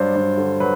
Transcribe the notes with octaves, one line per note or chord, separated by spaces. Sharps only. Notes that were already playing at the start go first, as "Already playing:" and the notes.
Already playing: G2 F#3 C5 D5
G2
D3
F#3 B4